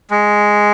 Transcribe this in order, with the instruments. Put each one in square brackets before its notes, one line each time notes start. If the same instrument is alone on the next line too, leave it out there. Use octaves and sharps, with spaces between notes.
[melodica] G#3